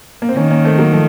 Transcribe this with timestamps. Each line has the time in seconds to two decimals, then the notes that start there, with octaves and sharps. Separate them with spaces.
0.22 A#3
0.29 C4
0.36 D#3 A#3 C#4
0.51 A#3 C#4
0.65 A3 C4
0.78 F#3 A#3
0.92 F3 A3